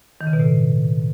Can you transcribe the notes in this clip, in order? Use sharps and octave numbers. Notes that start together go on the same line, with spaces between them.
D#3
C#3
B2
A2